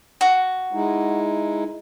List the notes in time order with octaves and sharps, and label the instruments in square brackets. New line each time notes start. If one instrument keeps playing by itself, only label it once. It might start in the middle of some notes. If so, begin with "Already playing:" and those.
[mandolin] F#4
[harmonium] G#3 D#4 E4